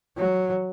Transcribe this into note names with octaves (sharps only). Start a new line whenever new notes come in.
F#3